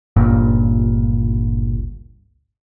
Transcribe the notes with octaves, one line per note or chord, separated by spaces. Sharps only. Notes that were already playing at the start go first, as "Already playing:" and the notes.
G1 C#2 G2 A#2